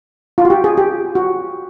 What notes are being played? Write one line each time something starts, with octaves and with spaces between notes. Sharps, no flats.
F4
F#4
G4
G#4
G4
F#4